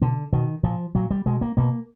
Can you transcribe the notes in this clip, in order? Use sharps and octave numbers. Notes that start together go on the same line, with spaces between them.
B2 D3
B2 D#3
A#2 F3
A#2 F#3
G3
B2 G#3
A#3
B2 A#3